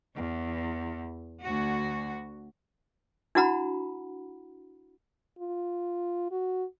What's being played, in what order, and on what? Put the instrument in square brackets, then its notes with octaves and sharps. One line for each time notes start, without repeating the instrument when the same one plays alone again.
[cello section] E2
D2 F#4
[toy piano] D4 E4 F#4 F#5 A#5 B5
[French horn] F4
F#4